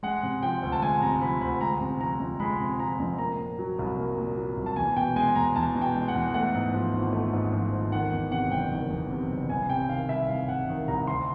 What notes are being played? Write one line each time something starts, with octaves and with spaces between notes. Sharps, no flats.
G#3 F#5
C3
F3 G5
D2
A5
G#3 G#5
C3 A#5
F3 B5
D2 B5
G#3 A#5
C3
F3 A#5
F2
G#3 B5
C3
F3 A#5
F2
A#3 A#5
A#2
F#3
C2
A#3
A#2
F#3
C2
A5
E2 G#5
B2 G5
G#3 G#5
E2 A#5
E2 A5
B2
G5
G#3
F#5
E2
A3 F#5
G#2
F3
G#1
A3
G#2
F3
G#1
D#3 F#5
E2
C3 F#5
F#1 G5
D#3
E2
C3
F#1
C2 G#5
C3 G5
D#3 F5
C2 E5
C2 F5
C3 F#5
D#3
C2 A#5
D2 C6